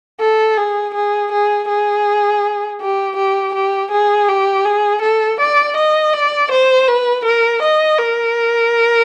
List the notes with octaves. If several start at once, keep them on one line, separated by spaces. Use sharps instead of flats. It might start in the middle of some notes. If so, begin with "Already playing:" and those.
A4
G#4
G#4
G#4
G#4
G4
G4
G4
G#4
G4
G#4
A4
D5
D#5
D5
C5
B4
A#4
D#5
A#4